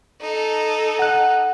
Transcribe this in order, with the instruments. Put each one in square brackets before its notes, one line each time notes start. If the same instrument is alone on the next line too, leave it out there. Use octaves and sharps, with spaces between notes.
[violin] D#4 A4
[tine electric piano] F#5 F#6